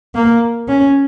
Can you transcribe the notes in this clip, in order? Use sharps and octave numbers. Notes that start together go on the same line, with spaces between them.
A#3
C#4